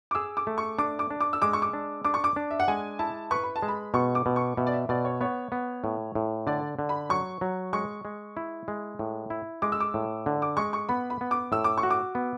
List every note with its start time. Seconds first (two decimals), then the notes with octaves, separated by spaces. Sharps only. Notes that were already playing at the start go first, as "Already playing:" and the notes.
0.11 D6
0.15 G#4 E6
0.37 D6
0.47 A3
0.58 C#6
0.79 D4 D6
0.99 D6
1.11 D4
1.20 D6
1.33 E6
1.42 G#3 D6
1.53 C#6
1.62 D6
1.73 D4
2.04 D4 D6
2.14 C#6
2.24 D6
2.36 D4
2.51 E5
2.60 F#5
2.68 G#3 G#5
2.99 E4 A5
3.31 B4 C#6
3.43 B5
3.56 A5
3.62 G#3
3.68 B5
3.94 B2 C#6
4.15 D6
4.26 B2
4.36 C#6
4.57 B2 E5
4.67 D5
4.73 E5
4.89 B2 D5
5.05 C#5
5.21 B3 C#5
5.52 B3
5.84 A2
6.15 A2
6.47 D3 D5
6.79 D3
6.89 B5
7.10 F#3 C#6
7.41 F#3
7.73 G#3 C#6
8.05 G#3
8.37 E4
8.68 G#3
8.99 A2
9.30 E4
9.62 G#3 D6
9.72 E6
9.80 D6
9.94 A2
10.26 D3
10.42 D6
10.57 G#3 C#6
10.73 C#6
10.89 B3 B5
11.10 B5
11.21 B3
11.31 D6
11.52 A2 E6
11.64 D6
11.78 C#6
11.83 F#4
11.90 D6
12.15 B3